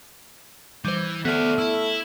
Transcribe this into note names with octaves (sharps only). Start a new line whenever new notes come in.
E3 G3 C5
A3 B3 F#4 D5 F6
E4 E6